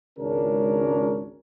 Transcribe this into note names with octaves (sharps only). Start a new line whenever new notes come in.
G#1 C#2 C#3 C#4 D4 A#4